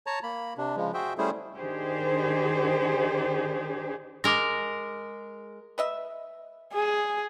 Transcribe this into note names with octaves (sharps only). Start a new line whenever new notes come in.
C#5 A5 A#5
A#3 B5
C3 D4
C#3 F3 G#3
F#4 G#4 C5 E5 G5
G3 A3 C#4 E4 G#4 C5
D#3 D4 G4 G#4 C5
G#3 A#4 D6 A#6
B4 D#5 E5
G#4